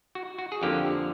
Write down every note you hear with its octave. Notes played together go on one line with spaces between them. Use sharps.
F#4
F#4
G#4
F2 D3 F3 A#3 G4